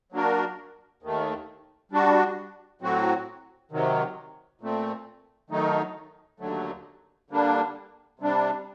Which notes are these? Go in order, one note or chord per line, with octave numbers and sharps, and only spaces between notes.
F#3 A#3 D4 F#4 A#4
D#2 D#3 A3
G3 D4 F#4
A2 F#3 C4 F#4
C3 D#3 F#3
A#2 A3 C4
D#3 F#3 A3 D#4
D#2 D3 F#3 A3
D3 G3 A#3 D4
C3 G3 D4